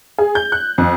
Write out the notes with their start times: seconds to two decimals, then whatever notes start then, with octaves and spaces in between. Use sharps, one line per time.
0.18 G#4
0.35 G6
0.52 F#6
0.78 F2